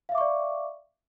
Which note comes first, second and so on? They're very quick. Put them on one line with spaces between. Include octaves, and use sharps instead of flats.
F5 E5 D6 C#6 D5